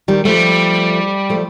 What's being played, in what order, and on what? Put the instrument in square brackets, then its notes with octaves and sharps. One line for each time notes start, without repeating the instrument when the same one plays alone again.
[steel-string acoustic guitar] D#3 G3
[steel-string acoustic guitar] F3 A3 [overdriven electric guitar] G3
[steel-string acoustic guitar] F3 A3